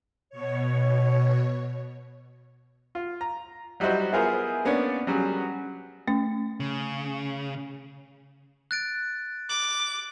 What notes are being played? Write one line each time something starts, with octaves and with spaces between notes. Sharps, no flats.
B2 C#5
F4
A#5
F#3 G3 D#4 E4 F#4 C5
B3 E4 F4 G#4 A#4 C5
A#3 B3 C#4 D4 C#5 D5
F#3 G3 C#4 F#4 G#4
A3 C#4
C#3
F#6 A6 D7
D6 F#7